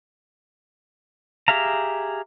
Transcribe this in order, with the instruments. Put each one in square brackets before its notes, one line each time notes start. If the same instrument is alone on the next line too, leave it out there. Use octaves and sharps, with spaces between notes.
[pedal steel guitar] G4 G#4 E5 F5 A#5